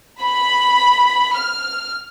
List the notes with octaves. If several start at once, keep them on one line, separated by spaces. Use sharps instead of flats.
B5
F6